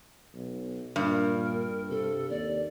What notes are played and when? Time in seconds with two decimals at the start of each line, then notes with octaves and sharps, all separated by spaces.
0.35 B1
0.96 G2 A#2 A#4
1.90 C3 A4
2.30 D#2 D5